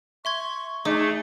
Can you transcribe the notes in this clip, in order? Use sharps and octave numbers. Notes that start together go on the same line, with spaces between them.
E5 C6 C#6 G#6
A3 D#4 G#4 D6